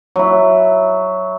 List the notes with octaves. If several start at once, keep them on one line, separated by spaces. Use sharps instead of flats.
F#3 E4